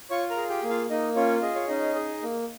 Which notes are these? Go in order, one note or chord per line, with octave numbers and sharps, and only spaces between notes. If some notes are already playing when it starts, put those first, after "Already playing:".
F4 C#5 C#6
A#4 A#5
G#4
G4 G5
A#3
F4 F5
A#3 D#4 D#5
C#4 F4 C#5
G#4 D#5
C#5
C#4 D#4 D#5
G#4
A#3